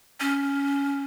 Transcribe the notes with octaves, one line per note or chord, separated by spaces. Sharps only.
C#4